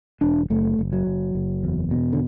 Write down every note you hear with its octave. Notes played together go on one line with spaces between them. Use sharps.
E1 D4
F#1 A3
F#1
F#3
F#1
F#1
E2
B2
D3